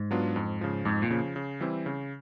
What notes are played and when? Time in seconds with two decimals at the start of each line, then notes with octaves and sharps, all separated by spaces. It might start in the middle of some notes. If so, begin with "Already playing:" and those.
Already playing: G#2
0.11 F#3 B3 D4 F4
0.36 F2
0.61 C#3 F3
0.85 F2 G#2
1.02 A#2
1.11 C#3 F3
1.36 C#3
1.61 E3 G3 C4 E4
1.86 C#3